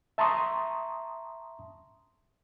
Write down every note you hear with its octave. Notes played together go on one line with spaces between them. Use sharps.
E5 A5 A#5 C6 C#6 D#6